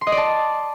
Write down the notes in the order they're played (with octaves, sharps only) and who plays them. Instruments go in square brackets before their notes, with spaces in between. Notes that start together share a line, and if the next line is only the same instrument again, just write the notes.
[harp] C6
D#5
D5
A5